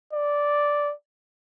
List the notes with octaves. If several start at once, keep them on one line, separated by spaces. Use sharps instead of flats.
D5